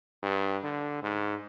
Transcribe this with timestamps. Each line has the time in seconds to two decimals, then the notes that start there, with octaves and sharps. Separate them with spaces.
0.23 G2
0.63 D3
1.03 G#2